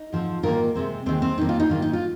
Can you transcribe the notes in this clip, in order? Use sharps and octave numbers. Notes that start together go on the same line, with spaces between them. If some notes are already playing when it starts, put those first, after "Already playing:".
Already playing: D#4
G#2 F3 C4
G#2 D#3 A#3 F4 A#4
C3 G#3 C4
D#2 D#3 G#3 C4
C4
F2 D#3 A#3 D#4
F4
D#4
G#2 D#3 A#3 F4
D#4
F4